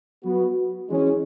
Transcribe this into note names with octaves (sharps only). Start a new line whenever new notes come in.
F#3 B3 F#4
E3 G#3 C#4